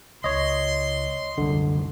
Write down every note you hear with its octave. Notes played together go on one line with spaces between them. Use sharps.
C#2 C#5 D#5 C6
C2 F#2 D3 G3